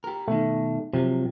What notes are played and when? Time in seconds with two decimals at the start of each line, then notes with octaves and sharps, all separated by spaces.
0.04 G4 A#4
0.28 B2 D#3 A3
0.93 C3 F3 F#3